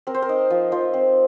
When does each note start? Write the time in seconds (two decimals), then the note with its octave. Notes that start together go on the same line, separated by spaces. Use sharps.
0.07 C4 A#4
0.14 C5
0.22 A#4
0.29 D#4
0.50 F3
0.72 F3 C5
0.94 C4